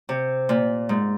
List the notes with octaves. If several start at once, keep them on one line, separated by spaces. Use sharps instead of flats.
C3
A#2
G#2